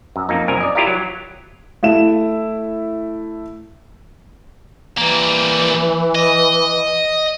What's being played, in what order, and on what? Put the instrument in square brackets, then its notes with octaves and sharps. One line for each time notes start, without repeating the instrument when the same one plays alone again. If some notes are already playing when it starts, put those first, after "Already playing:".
[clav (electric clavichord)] F#2
F2 A#3 D#4
C2 F#2 A#4 G#5
D5 D#5
E4 F4 G4 A#4 F5
F#3
[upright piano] A3 E4 E5 E7
[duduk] E3 [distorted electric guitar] G3 A#3
[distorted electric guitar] D#5